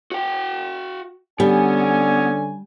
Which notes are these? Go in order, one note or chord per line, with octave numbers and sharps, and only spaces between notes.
F#4 G5
D3 G3 B3 C#4 G#5